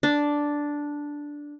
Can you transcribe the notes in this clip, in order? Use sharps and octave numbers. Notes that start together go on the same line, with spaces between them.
D4